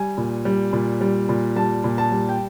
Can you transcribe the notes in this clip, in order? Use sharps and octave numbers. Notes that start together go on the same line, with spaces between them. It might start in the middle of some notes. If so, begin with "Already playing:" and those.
Already playing: G3 G#5
A#2
G3
A#2
G3
A#2
G3 A5
A#2
A5
G3
G5